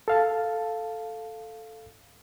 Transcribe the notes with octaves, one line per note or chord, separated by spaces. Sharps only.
A4 F5 A5